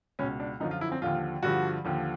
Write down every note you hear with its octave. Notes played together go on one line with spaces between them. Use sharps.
C#2 B2 C#4
D4
F#2 D3 F3 D#4
F4
E4
C4
D#2 D3 F3 F4
G2 D3 F3 F#4
D#2 D3 F3